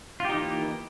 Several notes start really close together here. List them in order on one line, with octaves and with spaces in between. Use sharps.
F4 G4 D#4 E3 A#3